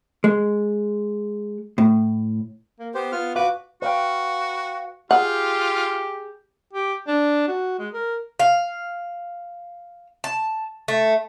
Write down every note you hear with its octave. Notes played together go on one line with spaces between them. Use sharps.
G#3
A2
A#3
B3 G4 C5
B3 F4 F6
F#4 B4 F5 D6
F#4 B4 F5 G5
F4 G4 G#4 F#5
G4
D4
F#4
G#3
A#4
F5
A5
A3